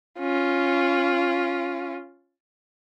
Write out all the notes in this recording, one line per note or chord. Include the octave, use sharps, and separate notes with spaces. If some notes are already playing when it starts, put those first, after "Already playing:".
C#4 F4